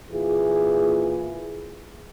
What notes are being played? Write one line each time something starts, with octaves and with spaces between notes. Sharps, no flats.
A#2 E3 E4 F4 G#4